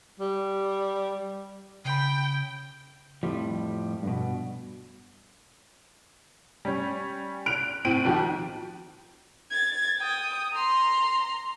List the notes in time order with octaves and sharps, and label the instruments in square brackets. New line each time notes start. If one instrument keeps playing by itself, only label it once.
[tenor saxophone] G3
[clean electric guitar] C#3 B5 [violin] G5
[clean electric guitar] F2 A2 F3 G3
G2 B2
[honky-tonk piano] G3 C#4
F#6 D7 F7
A2 C4 D7 D#7 F#7
B1 D#3 F3 F#4 G4
[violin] G#6 A6
G5 D#6
A#5 C6